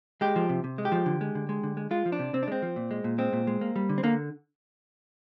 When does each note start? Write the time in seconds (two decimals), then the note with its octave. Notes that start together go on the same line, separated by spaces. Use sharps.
0.21 G#3 G4
0.36 F3
0.49 C3
0.64 C3
0.78 G#3
0.85 G4
0.92 F3
1.06 D3
1.21 G#3
1.35 D3
1.49 G#3
1.63 D3
1.77 G#3
1.91 G#3 F4
2.06 F3
2.12 D4
2.19 C3
2.33 C3 C4
2.43 D4
2.48 G#3 C4
2.62 F3
2.76 A#2
2.91 G#3
3.04 A#2
3.18 G#3 C4
3.33 A#2
3.47 G#3
3.61 A#3
3.76 G3
3.89 D3
3.98 C4
4.03 D3 A#3